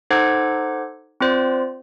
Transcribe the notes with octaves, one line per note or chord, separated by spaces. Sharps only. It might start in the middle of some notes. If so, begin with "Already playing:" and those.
D#4 A4 C5 F#5 D6 G#6
C4 F4 C5 D5